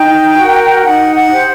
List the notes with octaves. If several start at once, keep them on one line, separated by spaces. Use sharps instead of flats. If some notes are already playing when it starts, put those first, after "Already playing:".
Already playing: D#4 G5
F#4 A#4
D#4 F#5
F#5
G4 C5